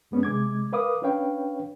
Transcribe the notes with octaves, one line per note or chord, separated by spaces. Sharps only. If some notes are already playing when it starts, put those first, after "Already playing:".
F#2 G#3 B3 C#4 D4
C3 G#3 D6 G#6
A#4 B4 F5 D6 D#6
C#4 D4 B4 C#5 F5 G5